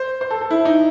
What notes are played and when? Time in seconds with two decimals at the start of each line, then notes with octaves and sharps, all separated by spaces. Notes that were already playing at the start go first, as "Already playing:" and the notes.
Already playing: C5
0.21 C5
0.31 A4
0.41 A4
0.51 E4
0.65 D#4